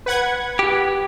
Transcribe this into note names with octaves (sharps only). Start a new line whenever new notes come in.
B4 F#5 G#6
G4